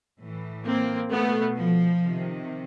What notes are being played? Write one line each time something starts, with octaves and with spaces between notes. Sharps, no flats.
A2 E3
A#3 C4
B2 A3 B3
F3
C3 D#3